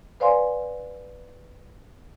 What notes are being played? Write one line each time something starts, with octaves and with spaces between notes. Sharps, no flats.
B4 C5 D5 F5 G#5 C6